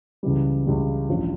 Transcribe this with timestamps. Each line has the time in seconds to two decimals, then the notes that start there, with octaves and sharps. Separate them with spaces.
0.23 C#2 C#3 E3 G3
0.66 C#2 C#3 E3 G3
1.09 A1 G2 F3 C#4 F4